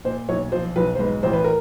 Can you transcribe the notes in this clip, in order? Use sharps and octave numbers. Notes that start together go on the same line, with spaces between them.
A#2 C5
B1 C#5
F3 C5
B1 B4
C5
G#2 B4
A1 C5
B4
A#4